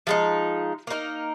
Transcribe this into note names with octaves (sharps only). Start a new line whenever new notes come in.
F3 G#3 D#4
A#3 D#4 A#4